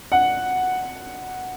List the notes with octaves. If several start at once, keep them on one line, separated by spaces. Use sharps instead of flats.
F#5